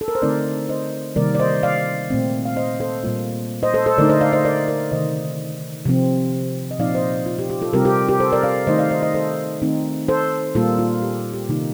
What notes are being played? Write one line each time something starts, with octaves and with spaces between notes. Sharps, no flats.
A4
A#4
C5
D3 A3 C4 D#4 A#4 D5
C5 D#5
C3 D#3 G3 A#3 A#4 D5
D5
C5 D#5
D5 F5
A#2 A3 C4
F5
C5 D#5
A4 C5
A#2 G3 A#3 F4
C5 D#5
A4 C5
A4 C5
D3 A3 D#4 A#4 D5
C5 D#5
D5 F5
C5 D#5
A#4 D5
A#4 D5
C3 D#3 A3 C5 D#5
C3 F3 C4
D#5
A#2 F3 C4 D#4 D5 F5
C5 D#5
F4
G4
G4
F4 A4
C3 G3 C4 F4 G4 A#4
G4 A#4
G4 A#4
A4 C5
A#4 D5
D5 F5
D#3 A3 D#4 C5 D#5
D5 F5
C5 D#5
C5 D#5
A4 C5
D#3 A3 C4 D#4
A4 C5
A#2 G3 A#3 F4 A4
F4
G4
G4
C3 D#3 A#3 D#4